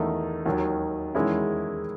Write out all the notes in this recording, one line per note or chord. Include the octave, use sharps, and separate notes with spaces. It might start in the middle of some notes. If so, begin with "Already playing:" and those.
Already playing: E2 D#3 A3 D#4
D#2 D#3 F#3
E2 D#3 G#3 C#4 E4